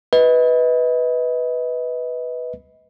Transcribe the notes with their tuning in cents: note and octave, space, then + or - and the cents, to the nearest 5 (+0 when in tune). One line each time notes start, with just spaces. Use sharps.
B4 +0 D#5 +30